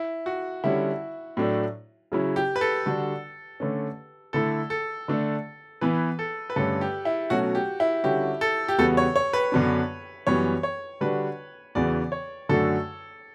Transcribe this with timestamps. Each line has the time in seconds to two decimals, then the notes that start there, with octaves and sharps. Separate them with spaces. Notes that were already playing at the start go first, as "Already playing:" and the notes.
Already playing: E4
0.26 F#4
0.64 D3 G3 C#4 E4
1.37 A2 F#3 A3 D4
2.12 C#3 F#3 C#4 E4
2.36 G4
2.56 B4
2.61 A4
2.86 D3 G3 D4 F#4
3.60 D3 A3 C#4
4.33 D3 A3 E4 A4
4.70 A4
5.08 D3 A3 D4
5.81 E3 B3 E4 B4
6.19 A4
6.50 B4
6.56 G2 D3 A3 C#4 A4
6.81 G4
7.05 E4
7.30 B2 F#3 A3 C#4 F#4
7.55 G4
7.80 E4
8.04 D3 G3 C#4 F#4 G4
8.41 A4
8.68 G4
8.79 E2 C#3 G3 B3 F#4 A4
8.97 C#5
9.16 C#5
9.33 B4
9.52 F#2 D3 F#3 B3 D4
10.27 F#2 E3 G3 B3 C#5
10.63 C#5
11.01 D3 G3 D4 F#4 B4
11.75 E2 C#3 E3 B3 F#4 D5
12.12 C#5
12.49 F#2 D3 A3 D4 F#4 A4